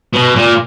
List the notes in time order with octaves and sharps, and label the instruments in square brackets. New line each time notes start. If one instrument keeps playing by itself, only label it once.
[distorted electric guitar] B2
A#2